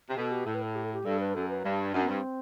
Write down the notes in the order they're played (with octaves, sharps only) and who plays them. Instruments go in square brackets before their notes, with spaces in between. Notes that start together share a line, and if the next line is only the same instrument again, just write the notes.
[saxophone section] C3
[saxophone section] B2 [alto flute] A4
[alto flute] G4
[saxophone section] A2 [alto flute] A4
[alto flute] B4
A4
G4
A4
G4
[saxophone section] G2 [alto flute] A4
[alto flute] B4
[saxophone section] F#2 [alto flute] A4
[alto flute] B4
[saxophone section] G2
[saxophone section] F#2 [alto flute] D4
[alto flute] B3
[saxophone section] G2 [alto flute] C4